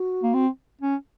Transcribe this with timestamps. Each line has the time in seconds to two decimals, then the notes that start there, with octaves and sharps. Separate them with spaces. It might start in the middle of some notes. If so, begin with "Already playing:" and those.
Already playing: F#4
0.23 A#3
0.34 C4
0.81 C#4